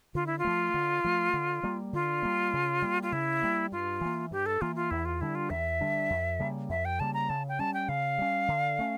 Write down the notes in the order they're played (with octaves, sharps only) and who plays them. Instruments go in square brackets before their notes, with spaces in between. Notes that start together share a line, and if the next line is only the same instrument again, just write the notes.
[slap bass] D3 [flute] F4
[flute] E4
F4
[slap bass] F3 A3
D3
F3 A3
D3
G3 A#3
[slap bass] D3 [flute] F4
[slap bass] G3 A#3
C#3
G3 A#3
[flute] F4
[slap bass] C#3 [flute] E4
[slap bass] G3 A#3
[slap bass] G2 [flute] F4
[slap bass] E3 A#3
[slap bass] G2 [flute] G4
[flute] A4
[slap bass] E3 A#3 [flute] F4
[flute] F4
[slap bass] E2 [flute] E4
[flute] F4
[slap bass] D3 G3 D4 [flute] E4
[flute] F4
[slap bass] E2 [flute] E5
[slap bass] D3 G3 D4
F2
C#3 G3 A#3
[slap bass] F2 [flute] E5
[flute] G5
[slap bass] C#3 G3 A#3 [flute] A5
[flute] A#5
[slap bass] C#3 [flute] A5
[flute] G5
[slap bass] G3 C#4 [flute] A5
[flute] G5
[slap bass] C#3 [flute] F5
[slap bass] G3 C#4
D3
A3 C#4